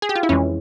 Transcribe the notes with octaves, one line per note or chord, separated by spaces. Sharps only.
G#4
G4
F4
E4
F2 E3 G#3 C#4